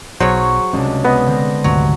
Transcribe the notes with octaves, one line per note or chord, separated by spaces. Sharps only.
B1 F#3 G#4 C5 C#5
C#2 C3 C#4 D4
B3 D#5
D3 C4 A#6
G#1 D2 C3 F#3